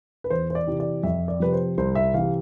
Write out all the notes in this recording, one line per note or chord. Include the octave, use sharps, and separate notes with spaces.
B4
E2 C5
C5
D5
C3 E3
D5
F2 E5
D5
C3 F3 B4
C5
C2 C5
E5
C3 E3 F5